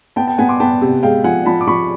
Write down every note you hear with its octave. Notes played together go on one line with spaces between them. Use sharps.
B3 G5 A5
G5 A5
B3 F#5 G#5
C6 D6
B3 G5 A5
C3
G#3 F5 G5
F3 F#5 G#5
F3 A5 B5
D6
F3 B5 C#6